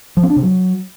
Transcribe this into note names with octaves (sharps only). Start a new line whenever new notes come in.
F3
C4
D4
C3
F#3